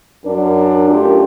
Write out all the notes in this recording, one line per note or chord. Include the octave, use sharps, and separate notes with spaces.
F#2 D4 A#4
A3 C#4 F4 G4 A#4